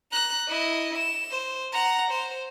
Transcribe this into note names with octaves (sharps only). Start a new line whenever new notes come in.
A#5 F#6
E4 D#5
E7
C5
F#5 A#5
C5